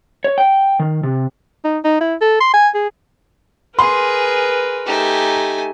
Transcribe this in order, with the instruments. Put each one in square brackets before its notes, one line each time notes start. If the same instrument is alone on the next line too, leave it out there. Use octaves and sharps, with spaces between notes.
[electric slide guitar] C#5
G5
D#3
C3
[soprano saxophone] D#4
D#4
E4
A4
C6
G#5
G#4
[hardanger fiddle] G#4 [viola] A#4 B4 [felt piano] C6
[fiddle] A3 G#5 [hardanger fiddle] D#4 G4